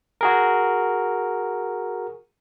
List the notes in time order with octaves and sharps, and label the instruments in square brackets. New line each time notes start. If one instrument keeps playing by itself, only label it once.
[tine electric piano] F#4 G#4 A#4